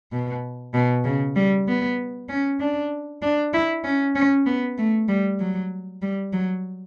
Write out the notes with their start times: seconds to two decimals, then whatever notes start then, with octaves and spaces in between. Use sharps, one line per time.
0.12 B2
0.74 B2
1.05 C#3
1.36 G3
1.67 B3
2.29 C#4
2.60 D4
3.22 D4
3.53 E4
3.84 C#4
4.15 C#4
4.46 B3
4.78 A3
5.08 G3
5.39 F#3
6.02 G3
6.33 F#3